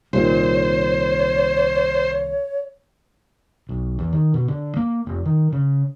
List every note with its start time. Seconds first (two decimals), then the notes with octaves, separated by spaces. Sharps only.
0.13 C2 A#2 D#3 C5 C#5
3.69 B1
3.99 E2
4.13 D#3
4.34 B2
4.48 D3
4.77 A#3
5.07 F1
5.25 D#3
5.52 C#3